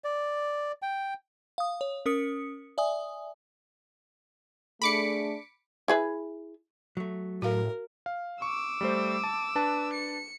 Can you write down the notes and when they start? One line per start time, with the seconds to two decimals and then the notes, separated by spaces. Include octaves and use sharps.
0.04 D5
0.82 G5
1.58 F5 D#6
1.81 C#5
2.06 C#4 A#4 D#6 C#7
2.78 D5 E5 G#5 D#6
4.82 A3 D4 G#4 B5 D6 C#7
5.88 E4 G#4 B4
6.97 F#3 A3
7.42 A2 F#4 A#4 F5
8.06 F5
8.42 C#6 D6 E6
8.81 G3 A3 C5
9.24 A5
9.55 D4 B4 A5
9.93 C#7